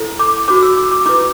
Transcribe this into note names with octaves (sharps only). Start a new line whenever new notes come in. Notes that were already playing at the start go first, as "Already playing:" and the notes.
Already playing: E4 A4 C5
D6
F#4 C5 D6
E6
D6
D6
E4 B4 D6